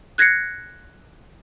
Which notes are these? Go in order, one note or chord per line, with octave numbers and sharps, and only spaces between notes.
F#6 G#6 A#6 C7 C#7